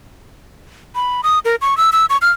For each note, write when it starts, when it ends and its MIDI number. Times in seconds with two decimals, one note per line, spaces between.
0.95 1.21 83
1.23 1.39 87
1.45 1.56 70
1.61 1.77 85
1.77 1.90 88
1.93 2.06 88
2.10 2.17 85
2.22 2.31 89